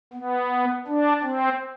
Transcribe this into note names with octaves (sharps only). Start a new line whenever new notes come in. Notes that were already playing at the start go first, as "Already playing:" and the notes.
B3
D4
C4